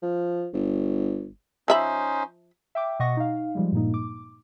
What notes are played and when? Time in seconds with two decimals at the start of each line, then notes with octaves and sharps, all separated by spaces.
0.02 F3
0.54 G1
1.68 F3 C#4 D#4 C5 E5 B5
2.75 E5 G5 D6
3.00 B2 D#5 F#5 C#6 A#6
3.17 D#4 F5
3.55 F3 G3 G#3
3.72 G2 A#2 A#3 D#4
3.94 D6